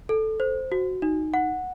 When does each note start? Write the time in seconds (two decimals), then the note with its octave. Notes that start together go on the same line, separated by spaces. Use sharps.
0.09 A4
0.40 C5
0.72 F#4
1.02 D#4
1.34 F#5